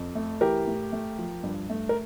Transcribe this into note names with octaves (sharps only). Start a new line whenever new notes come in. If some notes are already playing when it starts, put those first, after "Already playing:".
Already playing: F2
A3
E3 G4 A#4
A2
A3
F3
G2
A3
A#4